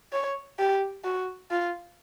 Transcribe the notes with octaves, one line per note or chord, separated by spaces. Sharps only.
C#5
G4
F#4
F4